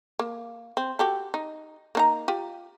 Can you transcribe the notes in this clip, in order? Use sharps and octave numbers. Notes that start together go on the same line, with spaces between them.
A#3
C4
F#4 G4 A4
D#4
A#3 D#4 A#5
F4 G4